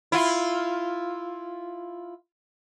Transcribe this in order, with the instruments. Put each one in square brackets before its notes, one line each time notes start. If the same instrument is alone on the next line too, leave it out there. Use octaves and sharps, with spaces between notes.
[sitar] E4 F4